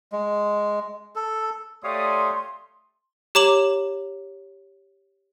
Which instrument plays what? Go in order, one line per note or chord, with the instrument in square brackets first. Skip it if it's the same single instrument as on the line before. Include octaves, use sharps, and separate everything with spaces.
[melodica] G#3
A4
[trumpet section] A3 D#6 [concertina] G4 C#5 F5 [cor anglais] D5 [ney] C6
[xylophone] G4 C#5 A#5 D6 E7 F#7